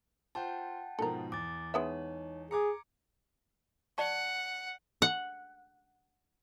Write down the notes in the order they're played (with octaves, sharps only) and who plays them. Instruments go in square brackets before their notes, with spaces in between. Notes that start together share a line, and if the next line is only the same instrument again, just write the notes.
[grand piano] F4 C5 C6 [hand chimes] F#5 G5 A5
[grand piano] G#2 B2 F3 [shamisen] A4 A#4
[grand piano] E2 [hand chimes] D6 A6
[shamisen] G#3 B3 E5 [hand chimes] D#4 C#5
[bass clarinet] G#4 [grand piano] A#5 D6 G#6 [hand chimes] C#7
[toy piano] D5 A5 C#6 [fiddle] F#5
[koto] F#5